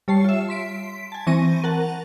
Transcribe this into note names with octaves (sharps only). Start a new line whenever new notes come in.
G3 C#5 A5 C7
F4 E5
C6 B6 D7
G#5 A5
E3 C4 C#6 A#6 D#7
A#4 F#5 A5